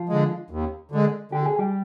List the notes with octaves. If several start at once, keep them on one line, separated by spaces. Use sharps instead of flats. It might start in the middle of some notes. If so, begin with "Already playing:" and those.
Already playing: F3 F4
D3 G#3
D#2
D3 G#3
D3 G4
G#4
G3 G4